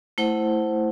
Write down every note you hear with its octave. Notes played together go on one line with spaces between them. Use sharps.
A3 E4 C5 F#5